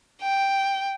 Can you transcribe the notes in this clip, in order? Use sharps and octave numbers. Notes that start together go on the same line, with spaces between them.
G5